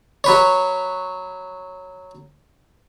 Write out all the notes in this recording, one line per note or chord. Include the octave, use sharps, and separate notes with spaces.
F#3 B4 C#5